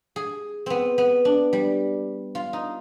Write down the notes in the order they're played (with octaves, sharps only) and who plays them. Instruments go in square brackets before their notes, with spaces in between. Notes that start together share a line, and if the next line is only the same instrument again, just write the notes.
[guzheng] G#4
B3 C4
B3
D4
G3
F4
D#4